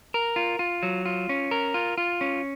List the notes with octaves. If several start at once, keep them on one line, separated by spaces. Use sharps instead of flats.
A#4
F4
F4
F#3
F4
C#4
A#4
F4
F4
C#4